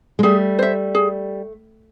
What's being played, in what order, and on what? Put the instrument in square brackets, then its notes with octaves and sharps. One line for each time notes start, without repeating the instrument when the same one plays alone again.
[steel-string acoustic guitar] G#3
[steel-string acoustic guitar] G3 A3 [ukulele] G#4
[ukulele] C5 E5
G#4